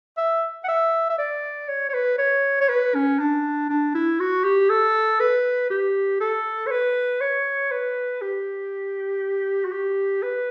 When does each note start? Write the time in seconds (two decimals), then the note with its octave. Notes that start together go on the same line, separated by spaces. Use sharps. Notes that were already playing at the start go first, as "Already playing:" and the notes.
0.18 E5
0.64 F#5
0.68 E5
1.10 E5
1.19 D5
1.69 C#5
1.89 C#5
1.94 B4
2.18 C#5
2.61 C#5
2.69 B4
2.95 C#4
3.19 D4
3.69 D4
3.95 E4
4.20 F#4
4.44 G4
4.70 A4
5.20 B4
5.71 G4
6.21 A4
6.67 C#5
6.71 B4
7.21 C#5
7.71 B4
8.21 G4
9.64 F#4
9.72 G4
10.23 B4